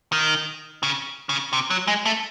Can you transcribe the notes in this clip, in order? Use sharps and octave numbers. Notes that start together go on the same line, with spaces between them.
D#3
C#3
C#3
C3
F#3
G#3
A3